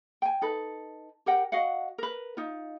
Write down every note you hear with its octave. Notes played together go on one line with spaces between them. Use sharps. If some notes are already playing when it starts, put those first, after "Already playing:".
G5 G#5
D#4 A4 B4
G4 A#4 F#5 G5
F#4 D#5 F5 F#5
A#4 B4
D#4 F4